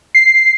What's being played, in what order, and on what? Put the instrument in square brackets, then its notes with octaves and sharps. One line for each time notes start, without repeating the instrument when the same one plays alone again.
[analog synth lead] C7